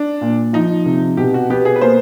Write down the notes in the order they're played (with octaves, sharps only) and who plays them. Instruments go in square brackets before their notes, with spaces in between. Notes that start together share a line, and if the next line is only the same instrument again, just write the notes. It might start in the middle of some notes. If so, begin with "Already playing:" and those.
Already playing: [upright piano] D4
[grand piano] A#2
[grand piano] F3 [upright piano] D#4
[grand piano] C3
[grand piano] B2 [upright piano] G4
[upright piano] F#4
[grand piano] B3 [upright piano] G4
[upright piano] G#4
B4
[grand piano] A#3 [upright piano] C5